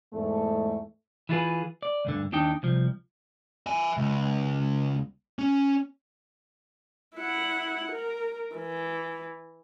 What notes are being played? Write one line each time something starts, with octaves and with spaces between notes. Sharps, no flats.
E2 G#2 A3
E3 E4 F4 G#4 B4
D5
D2 G2 D3
D#2 D4 D#4 G5
C2 F3
E5 G#5
C#2
C#4
E4 F#5
A#4
E3